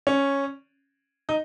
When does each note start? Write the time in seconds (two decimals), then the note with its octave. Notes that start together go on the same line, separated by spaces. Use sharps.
0.07 C#4
1.29 D#4